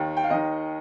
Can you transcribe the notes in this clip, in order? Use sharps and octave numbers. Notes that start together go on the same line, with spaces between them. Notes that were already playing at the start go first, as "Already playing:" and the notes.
Already playing: D#2 D#3
G5
F5
D#2 D#3 D#5